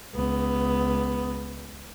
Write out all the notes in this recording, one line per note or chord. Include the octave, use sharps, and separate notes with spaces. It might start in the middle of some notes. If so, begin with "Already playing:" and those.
C#2 B3